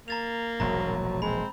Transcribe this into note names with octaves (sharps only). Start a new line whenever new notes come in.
A#3 A#5 A6 F7
E1 A#1 G#2 F#3 A#5
G#3 C4 B5